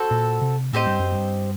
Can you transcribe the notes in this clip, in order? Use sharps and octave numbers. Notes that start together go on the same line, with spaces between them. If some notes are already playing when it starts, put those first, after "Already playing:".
Already playing: C4 F#4 A4
A#2
C3
A2 C4 G4 C5 D#5
G2
F#2
G2